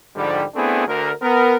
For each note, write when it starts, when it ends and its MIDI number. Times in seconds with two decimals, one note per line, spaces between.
0.16 0.45 44
0.16 0.45 50
0.16 0.45 53
0.16 0.45 55
0.55 0.86 57
0.55 0.86 59
0.55 0.86 60
0.55 0.86 62
0.55 0.86 64
0.55 0.86 68
0.87 1.11 38
0.87 1.11 70
1.22 1.56 59
1.22 1.56 70